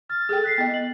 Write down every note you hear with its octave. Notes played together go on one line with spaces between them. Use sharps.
F6 A6
G#4 A4 G5
F#6 B6 C7
B3 D#5 G5
F#7